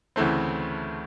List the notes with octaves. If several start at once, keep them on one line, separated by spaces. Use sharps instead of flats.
D2 C#3 E3 A3 C4